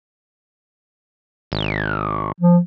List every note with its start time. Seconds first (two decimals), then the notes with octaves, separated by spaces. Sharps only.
1.52 G#1
2.40 F3